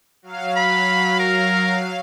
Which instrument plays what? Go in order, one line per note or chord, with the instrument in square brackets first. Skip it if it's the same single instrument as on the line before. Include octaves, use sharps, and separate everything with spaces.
[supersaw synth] F#3 F5
[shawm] B5
A#4